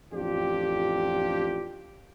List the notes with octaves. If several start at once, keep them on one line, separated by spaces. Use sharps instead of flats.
A1 F2 D4 F4 G4